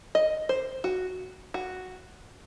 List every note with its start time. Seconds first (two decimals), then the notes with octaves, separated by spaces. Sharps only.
0.15 D#5
0.49 C5
0.84 F#4
1.54 F#4